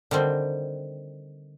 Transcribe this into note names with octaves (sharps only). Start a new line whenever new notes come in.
D3 D#3 G3 C4